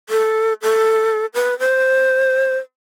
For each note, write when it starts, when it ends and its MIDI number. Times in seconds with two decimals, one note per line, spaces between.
0.09 0.53 69
0.62 1.26 69
1.34 1.58 71
1.59 2.58 72